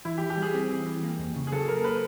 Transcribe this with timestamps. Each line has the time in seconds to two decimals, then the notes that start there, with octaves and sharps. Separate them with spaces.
0.05 E3 E4
0.18 G4
0.21 E3
0.30 G4
0.37 G3 G#4
0.54 C4
0.70 E3
0.86 E3
1.03 A#3
1.19 F2
1.36 C#3
1.47 G#4
1.52 F#3 A4
1.68 A#3 A#4
1.84 B4